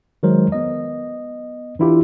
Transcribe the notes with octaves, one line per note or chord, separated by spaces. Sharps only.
D#3 F#3 G#3 A#4 C5
B3 D#5
E3 D4 E4 F4 G4